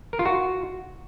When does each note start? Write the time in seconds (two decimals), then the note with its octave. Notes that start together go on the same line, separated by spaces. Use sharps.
0.13 A#4
0.19 F4
0.25 F#4